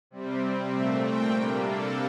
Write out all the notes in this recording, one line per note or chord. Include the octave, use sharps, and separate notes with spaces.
C3 G3 C4
A#2 A3 C4 E5
G5
C3 G3 A#3 D4
A4